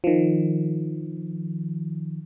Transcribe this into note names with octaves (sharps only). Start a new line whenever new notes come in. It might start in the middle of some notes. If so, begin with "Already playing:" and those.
D#3 F3